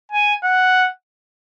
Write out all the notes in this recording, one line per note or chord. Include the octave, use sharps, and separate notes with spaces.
G#5
F#5